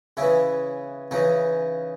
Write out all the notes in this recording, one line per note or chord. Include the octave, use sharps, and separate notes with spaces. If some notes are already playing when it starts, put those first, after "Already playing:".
C#3 E3 E4
C#3 E3 D#4